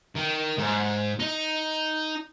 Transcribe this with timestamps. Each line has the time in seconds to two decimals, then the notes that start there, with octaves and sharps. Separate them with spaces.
0.15 D#3
0.58 G#2
1.19 D#4